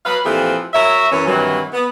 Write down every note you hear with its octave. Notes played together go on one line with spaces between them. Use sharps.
F#3 B4 F5
A#2 E3 F3 A3 C4 G4
F#3 A#4 C#5 E5
F#2 E3 C#4
G2 C3 D#3 E3 F#3
B3